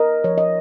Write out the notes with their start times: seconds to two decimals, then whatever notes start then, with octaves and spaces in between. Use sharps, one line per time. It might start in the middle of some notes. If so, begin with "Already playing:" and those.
Already playing: A#4 D#5
0.24 F3 C#5
0.38 D#5